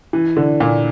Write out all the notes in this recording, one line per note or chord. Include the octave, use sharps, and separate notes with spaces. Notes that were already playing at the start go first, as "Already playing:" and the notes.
E3
D3
A#2